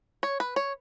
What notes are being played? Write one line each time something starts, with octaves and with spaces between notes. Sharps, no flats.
C#5
B4
C#5